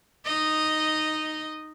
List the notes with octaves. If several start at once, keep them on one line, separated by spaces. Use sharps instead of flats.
D#4 D#5